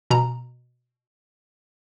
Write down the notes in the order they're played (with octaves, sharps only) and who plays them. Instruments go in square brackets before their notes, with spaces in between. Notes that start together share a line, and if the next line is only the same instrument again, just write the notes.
[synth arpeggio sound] B2 A#5